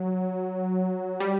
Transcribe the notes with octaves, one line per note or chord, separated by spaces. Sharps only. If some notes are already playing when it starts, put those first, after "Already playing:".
Already playing: F#3
G3